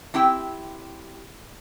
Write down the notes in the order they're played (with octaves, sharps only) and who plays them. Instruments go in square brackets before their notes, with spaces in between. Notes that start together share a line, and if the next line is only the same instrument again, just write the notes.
[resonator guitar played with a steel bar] C4 E4 G4 G5